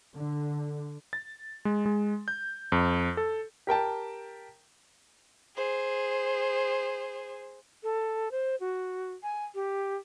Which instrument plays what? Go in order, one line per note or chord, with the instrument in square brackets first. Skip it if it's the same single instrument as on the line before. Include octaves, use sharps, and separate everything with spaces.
[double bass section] D3
[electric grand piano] A6
G#3
G#3
G6
F2
A4
[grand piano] G4 A#4 G5 A5
[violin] G#4 C5
[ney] A4
C5
F#4
G#5
G4